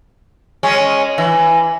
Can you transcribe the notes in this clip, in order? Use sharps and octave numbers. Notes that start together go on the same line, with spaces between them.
G#3 C#4
E3